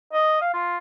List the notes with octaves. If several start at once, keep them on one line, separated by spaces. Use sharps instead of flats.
D#5
F5
F4